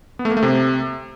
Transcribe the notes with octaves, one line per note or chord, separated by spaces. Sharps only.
B3
A3
A#3
A3
C3